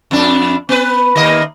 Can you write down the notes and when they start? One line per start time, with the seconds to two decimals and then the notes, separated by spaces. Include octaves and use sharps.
0.11 F2 D4
0.69 B3 B4
1.16 D#2 A#3 D#5